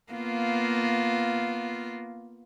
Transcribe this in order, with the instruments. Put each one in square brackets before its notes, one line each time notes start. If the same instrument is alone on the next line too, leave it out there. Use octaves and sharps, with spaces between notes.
[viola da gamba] A#3 B3 F4